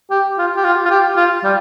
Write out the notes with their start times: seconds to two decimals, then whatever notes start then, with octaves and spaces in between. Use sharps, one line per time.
0.10 G4
0.38 F4
0.57 G4
0.64 F4
0.85 F4
0.90 G4
1.16 F4
1.44 G3